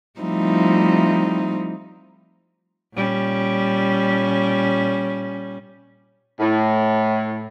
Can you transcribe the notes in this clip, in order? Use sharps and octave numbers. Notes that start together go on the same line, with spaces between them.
F3 G3 A3 C4 D#4 E4
A#2 G3 C#4
A2